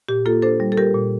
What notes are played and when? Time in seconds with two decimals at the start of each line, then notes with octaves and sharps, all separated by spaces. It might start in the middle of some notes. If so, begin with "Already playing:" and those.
0.09 A#2 G4
0.26 A#3 F4 A4
0.42 D4 A4 C5
0.60 G3
0.72 A4
0.77 G3 G4 A#4
0.94 A#2